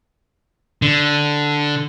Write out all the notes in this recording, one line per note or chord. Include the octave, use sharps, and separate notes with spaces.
D3